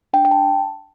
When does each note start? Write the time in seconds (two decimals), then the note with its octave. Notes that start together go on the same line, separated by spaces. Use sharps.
0.13 D4 G5
0.25 G5
0.31 A5